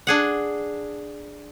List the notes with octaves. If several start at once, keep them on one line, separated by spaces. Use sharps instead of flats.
D4 G#4 F#5